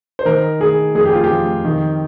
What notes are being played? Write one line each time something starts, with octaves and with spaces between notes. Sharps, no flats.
C5
D#3 A#4
D#3 G#4
F2 G#4
G4
F4
G4
F2
D#3